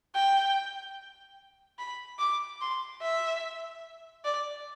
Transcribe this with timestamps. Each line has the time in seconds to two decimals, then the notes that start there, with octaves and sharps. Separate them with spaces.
0.15 G5
1.79 B5
2.19 D6
2.61 C6
3.02 E5
4.24 D5